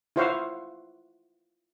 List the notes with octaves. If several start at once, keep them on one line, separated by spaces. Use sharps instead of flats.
E4 F4 C5 C#5 F5 F#5